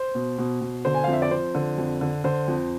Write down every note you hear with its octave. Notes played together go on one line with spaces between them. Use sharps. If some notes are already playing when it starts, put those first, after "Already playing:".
Already playing: C5
B2
B2
B2
D3 C5
G#5
F2 F5
E5
D5
F2 C5
D3
F2
D3
D3 C5
F2